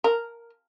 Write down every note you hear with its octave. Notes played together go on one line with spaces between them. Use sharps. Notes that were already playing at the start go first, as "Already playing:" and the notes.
A#4